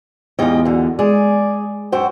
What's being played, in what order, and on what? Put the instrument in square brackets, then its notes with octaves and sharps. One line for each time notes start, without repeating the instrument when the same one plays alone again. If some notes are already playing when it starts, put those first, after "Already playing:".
[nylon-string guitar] E2 F4 [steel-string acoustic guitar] G#2 G4 D#5
[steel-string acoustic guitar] F#2 D3
[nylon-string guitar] G#3 [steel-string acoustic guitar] G#4 [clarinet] D5
[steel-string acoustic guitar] F#2 F#4 C5 [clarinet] G5